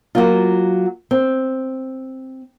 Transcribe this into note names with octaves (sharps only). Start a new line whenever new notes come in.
F#3 A#3 F4
C4